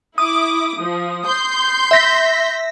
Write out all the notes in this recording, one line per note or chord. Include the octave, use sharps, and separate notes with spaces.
E4 D6 D#6
F3
C6 G6
E5 A#6 B6